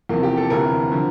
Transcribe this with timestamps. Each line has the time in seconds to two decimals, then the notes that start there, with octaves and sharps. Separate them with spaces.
0.09 E2 C3 F3 A#3
0.23 G4
0.37 A4
0.50 E1 D2 C3 E3 A#4
0.91 D3 F3